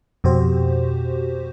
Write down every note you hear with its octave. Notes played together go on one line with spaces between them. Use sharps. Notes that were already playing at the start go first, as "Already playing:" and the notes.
F2 B2 F#4 G4 C5